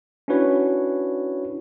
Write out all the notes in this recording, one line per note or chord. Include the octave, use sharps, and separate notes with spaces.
C#4 D4 E4 F#4 B4 C#5